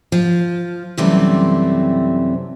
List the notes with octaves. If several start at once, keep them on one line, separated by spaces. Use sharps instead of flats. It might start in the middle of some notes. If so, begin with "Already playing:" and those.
F3
F#2 C3 E3 G3 A3 C4